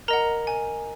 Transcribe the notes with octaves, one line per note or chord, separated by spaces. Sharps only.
A#4 D#5 F#5 A#5
G#5